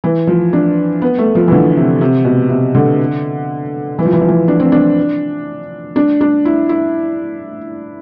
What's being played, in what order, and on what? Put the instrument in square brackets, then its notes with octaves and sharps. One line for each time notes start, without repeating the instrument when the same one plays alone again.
[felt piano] E3
F3
D4
B3
A3
F3
E3
D3
C3
C3
B2
C3
D3
E3
F3
E3
F3
E3
D4
C4
D4
D4
D4
E4
E4